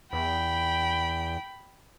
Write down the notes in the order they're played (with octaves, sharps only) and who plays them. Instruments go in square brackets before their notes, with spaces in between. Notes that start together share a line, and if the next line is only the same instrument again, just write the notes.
[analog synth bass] E2 [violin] G5 [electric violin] B5